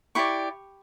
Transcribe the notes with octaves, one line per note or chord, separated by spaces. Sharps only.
E4 G4 D5 C#6